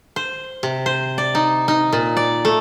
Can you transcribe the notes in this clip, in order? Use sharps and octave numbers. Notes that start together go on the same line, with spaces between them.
C5
C3
C5
D5
D#4
D#4
A#2
D5
A3